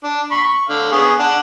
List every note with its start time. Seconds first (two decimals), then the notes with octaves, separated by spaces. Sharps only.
0.04 D4
0.31 B5 C#6
0.44 C#6
0.69 D3 F5
0.92 B3 G#4 C#6
1.19 D4 F#5